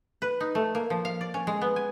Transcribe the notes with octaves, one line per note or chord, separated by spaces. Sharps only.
B4
D#4
A3
A#3
F3
F5
D5
C#4
G#3
B3
G#5